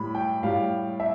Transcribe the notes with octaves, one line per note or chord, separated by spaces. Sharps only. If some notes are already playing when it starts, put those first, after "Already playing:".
Already playing: A2 G3 B5
G5
A2 G3 F5
E5